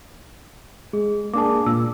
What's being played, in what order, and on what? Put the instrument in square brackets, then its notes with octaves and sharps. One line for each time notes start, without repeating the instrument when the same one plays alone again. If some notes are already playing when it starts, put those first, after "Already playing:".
[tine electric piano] G#3 [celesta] G#4
[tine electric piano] A#3 D4 G#4 [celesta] A5 D6
[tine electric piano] A#2 [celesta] E6